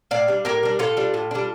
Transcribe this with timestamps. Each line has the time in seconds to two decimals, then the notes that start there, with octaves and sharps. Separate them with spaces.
0.11 A2 D5 F5
0.28 G3 D4
0.45 A2 G4 A#4
0.63 G3 D4
0.79 A2 F4 A4
0.97 G3 D4
1.14 A2
1.31 G3 D4